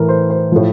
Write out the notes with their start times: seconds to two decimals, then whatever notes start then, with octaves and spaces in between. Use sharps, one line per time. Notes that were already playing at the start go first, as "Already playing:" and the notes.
Already playing: A2 E3 A#4
0.09 C5
0.30 C5
0.52 A2 F3